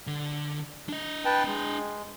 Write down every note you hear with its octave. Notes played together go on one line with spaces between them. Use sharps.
D3
D4 D#5
B4 G5 A5
G#3